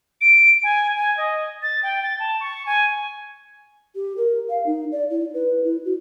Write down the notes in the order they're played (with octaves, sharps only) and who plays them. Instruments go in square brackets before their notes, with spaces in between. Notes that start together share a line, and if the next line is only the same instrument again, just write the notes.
[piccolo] D7
G#5
G#5
D#5
A6
G5
A6
A5
C#6
G#5
[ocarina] G4
A#4
F5
D#4
D5
E4
B4
E4
F#4